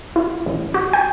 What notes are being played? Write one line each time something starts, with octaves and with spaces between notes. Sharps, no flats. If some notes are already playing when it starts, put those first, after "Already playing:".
E4
A1
F#4
G5